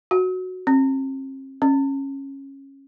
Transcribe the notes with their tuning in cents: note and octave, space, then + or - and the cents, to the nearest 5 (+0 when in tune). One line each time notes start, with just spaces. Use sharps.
F#4 -5
C4 +45
C#4 -15